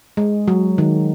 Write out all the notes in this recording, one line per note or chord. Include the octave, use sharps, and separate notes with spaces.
G#3
F#3
D#3